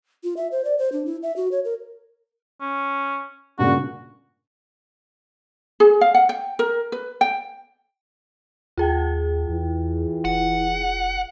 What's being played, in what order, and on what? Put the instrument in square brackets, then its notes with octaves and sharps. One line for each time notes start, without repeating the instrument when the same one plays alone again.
[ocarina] F4
E5
C5
D5
C5
D4
E4
E5
F#4
C#5
A#4
[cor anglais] C#4
[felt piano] G2 A#2 C#3 [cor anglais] F#4
[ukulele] G#4
F5
F#5
G5
A#4
B4
G5
[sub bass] D#2 [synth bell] F4 G#4 G5
[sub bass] E2 [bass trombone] E3
[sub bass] F1 [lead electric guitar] F#5